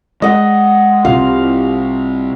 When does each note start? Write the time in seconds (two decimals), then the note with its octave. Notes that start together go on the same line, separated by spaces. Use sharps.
0.22 G#3 D#5 F#5
1.05 C2 C3 F4 F5